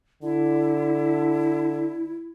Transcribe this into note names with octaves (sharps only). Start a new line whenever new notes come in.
D3 E4